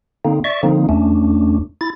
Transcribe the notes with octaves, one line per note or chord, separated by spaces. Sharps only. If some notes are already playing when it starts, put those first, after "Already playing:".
D3 A#3 C4 D#4
D5 E5 C#6
D3 F3 A#3 C4 D#4
E2 A3 C#4 D4
E4 A6